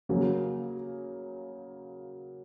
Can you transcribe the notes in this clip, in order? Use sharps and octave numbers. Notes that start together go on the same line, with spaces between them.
C#3 F#3 A#3